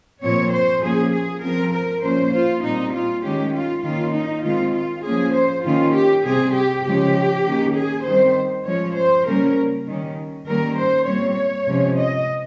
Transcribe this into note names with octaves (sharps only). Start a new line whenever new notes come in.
A#2 F3 C4 C#5
C5
F3 A#3 C#4 G#4
G#4
F3 C4 A#4
A#4
A#2 F3 A#3 C#4 C5
F4
A#2 G3 C4 D#4
F4
D#3 G#3 C#4 G4
F4
D#3 A#3 C#4 F4
D#4
D#3 G#3 C4 F4
F4
F3 A#3 C#4 G#4
C5
D#3 A#3 C#4 F4
G4
C3 G3 C4 G#4
G4
C#3 F3 G#3 C#4 G4
D#3 A#3 C#4
G#4
D#3 G3 C4 C5
F3 G#3 C#4 C#5
C5
C#3 G3 A#3 C#4 A#4
D#3 G3 C#4
D#3 G3 A#3 C#4 A#4
C5
A#2 G3 C4 C#5
C3 F3 G#3 C#4
D#5